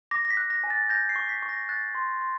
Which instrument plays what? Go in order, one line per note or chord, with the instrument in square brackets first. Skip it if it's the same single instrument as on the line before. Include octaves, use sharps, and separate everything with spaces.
[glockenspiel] D6 A#6
A#6
B6
F#6
A#6
G#5
A6
G6 A#6
C7
C#6
B6
C#6
A#6
F#6 A6
C6
C6